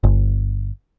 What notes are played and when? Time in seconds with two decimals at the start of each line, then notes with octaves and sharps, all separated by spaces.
0.03 G1